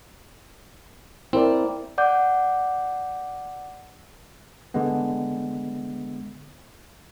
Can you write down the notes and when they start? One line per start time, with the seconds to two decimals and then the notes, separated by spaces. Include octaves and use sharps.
1.33 C4 E4 A#4 D5
1.98 D5 F#5 D6 G6
4.74 D3 G#3 B3